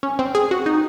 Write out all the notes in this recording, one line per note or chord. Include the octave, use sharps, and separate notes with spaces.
C#4
C4
G#4
F#4
D#4